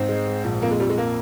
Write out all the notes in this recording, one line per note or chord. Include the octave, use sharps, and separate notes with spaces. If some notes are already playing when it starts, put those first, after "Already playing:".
Already playing: G#2 C4
G#3
G#3
A#1
F2 A#3
G#3
F2 G3
G#3
A#3